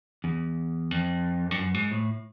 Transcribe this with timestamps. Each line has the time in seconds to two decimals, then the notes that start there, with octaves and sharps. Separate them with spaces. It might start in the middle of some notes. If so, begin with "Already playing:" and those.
0.24 E2
0.91 F2
1.51 G2
1.58 F#2
1.74 G#2
1.92 A2